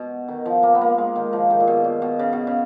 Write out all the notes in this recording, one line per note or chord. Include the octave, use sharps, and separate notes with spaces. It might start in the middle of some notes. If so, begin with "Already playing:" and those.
Already playing: B2
D#3
F3
A#3
B3
A#3
G#3
D#3
F3
D#3
A#2
B2
A#2
B2
C#3
B2
C#3